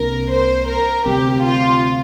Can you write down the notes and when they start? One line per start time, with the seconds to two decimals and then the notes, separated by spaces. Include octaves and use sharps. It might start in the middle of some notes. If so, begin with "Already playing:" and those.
Already playing: C2 C3 A#3 D4 A#4
0.32 C5
0.68 A#4
1.06 D2 C3 G3 C4 G4
1.44 F4